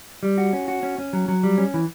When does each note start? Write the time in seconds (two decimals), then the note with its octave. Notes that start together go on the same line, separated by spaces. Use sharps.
0.23 G3
0.38 F#4
0.53 C#4
0.68 F#4
0.83 C#4
0.98 C#4
1.13 F#3
1.28 F#3
1.43 G3
1.58 C#4
1.74 E3